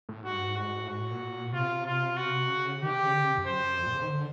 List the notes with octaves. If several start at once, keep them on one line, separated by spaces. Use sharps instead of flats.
A2
G#2 F#4
G2
G#2
F#4
A2
G#2 F#4
A2
A#2
C3 F4
F4
F#4
C#3
D#3 G4
C3
C#3
D3
C#3
C3
F#2
C5
F2
A#2
C#3
D#3
D3